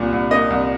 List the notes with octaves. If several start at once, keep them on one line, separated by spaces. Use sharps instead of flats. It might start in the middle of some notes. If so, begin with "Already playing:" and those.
Already playing: C2 A#2
C2
A#3 D#5
C2